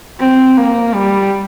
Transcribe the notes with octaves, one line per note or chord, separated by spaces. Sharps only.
C4
A#3
G3